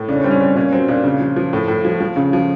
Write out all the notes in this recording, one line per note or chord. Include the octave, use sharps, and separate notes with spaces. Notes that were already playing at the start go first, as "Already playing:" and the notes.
Already playing: A2
C#3 D4
C#4
G3 C4
C#4
G3
A#2 C#4
F#3 C4
A#2 D4
C#3
F3
F3
A2
A2
F3
F3
C#3
F3